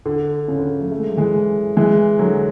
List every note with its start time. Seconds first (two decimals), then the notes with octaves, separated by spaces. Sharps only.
0.06 D3
0.48 C#3
0.59 D3
0.70 D3
0.81 F#3 A3
0.92 A3
1.00 G#3
1.09 F#3
1.17 E3 G#3
1.77 E3 G#3
2.19 D3 F#3